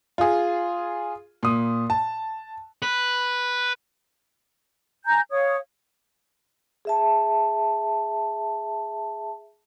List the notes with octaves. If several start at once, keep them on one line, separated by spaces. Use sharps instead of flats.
F4 G#4
A#2 D#6
A5
B4
G#5 A#5 G6
C#5 F5 D#6
G#4 E5 A5